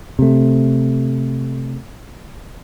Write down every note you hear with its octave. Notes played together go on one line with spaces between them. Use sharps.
C3 A3